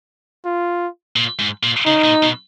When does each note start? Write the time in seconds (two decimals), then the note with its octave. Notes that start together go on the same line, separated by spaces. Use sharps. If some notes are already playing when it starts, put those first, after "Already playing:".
0.45 F4
1.16 A#2
1.39 G#2
1.63 A#2
1.86 C#3 D#4
2.05 A#2
2.23 B2